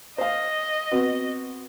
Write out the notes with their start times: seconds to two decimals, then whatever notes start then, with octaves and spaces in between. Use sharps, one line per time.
0.18 C5 D#5 F5
0.91 B3 C4 F#4